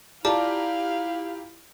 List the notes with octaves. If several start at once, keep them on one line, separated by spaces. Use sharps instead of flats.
E4 F4 G4 D5 F5 A5 A#5 D6